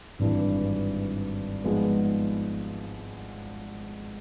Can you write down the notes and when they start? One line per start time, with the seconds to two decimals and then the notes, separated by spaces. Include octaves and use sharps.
0.19 G#1 G2 E3
1.64 G#2 F3 G#3 B3